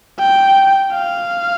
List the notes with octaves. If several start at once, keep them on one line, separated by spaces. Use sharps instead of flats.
G5
F5